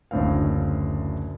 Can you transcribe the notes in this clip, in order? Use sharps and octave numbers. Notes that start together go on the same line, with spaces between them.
F#1 D2 A2 C4 F5